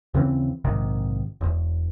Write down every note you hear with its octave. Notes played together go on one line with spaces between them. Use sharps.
D#2 C#3 E3 C4
A#1 G#2 C3 D#3
E1 E2